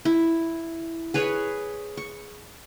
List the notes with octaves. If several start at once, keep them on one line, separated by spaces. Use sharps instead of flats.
E4
G#4 B4 C#5
C#6